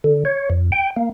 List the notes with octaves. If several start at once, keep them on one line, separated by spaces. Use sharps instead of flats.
D3
C#5
F2
G5
A#3